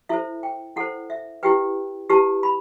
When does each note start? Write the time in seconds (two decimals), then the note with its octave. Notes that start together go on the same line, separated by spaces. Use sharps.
0.09 E4 A4 C5 E5
0.43 G5
0.76 E4 A4 C5 F#5
1.10 E5
1.43 E4 G4 B4 G5
2.10 E4 G4 B4 A5
2.43 B5